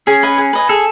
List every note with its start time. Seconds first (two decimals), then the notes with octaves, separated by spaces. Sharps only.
0.07 C#4 G#4
0.23 B4 D#5 G#5
0.38 G#4
0.53 B4 D#5 G#5
0.69 G#4 A4